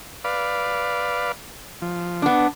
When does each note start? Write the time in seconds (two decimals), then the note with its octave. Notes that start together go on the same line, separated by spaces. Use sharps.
0.24 B4 D5 F5
1.82 F3
2.22 B3 D4